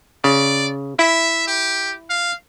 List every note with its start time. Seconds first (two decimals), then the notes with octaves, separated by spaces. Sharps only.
0.24 C#3 D5
0.99 E4 E5
1.47 G4
2.10 F5